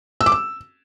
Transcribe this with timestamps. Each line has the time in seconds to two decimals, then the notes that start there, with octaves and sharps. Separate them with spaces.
0.21 E6
0.26 D6
0.32 E6